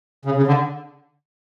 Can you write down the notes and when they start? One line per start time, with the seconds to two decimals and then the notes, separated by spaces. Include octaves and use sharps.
0.25 C#3
0.37 C#3
0.47 D3